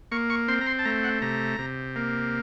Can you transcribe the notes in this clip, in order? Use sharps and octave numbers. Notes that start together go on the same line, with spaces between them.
A#3 C#6
C#6
C4 C6
A#5
C6
A5
A3 A#5
F#5
C3 A#5
C3
A#3